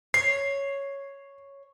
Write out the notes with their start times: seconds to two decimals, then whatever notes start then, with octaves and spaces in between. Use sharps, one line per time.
0.14 C#5 C7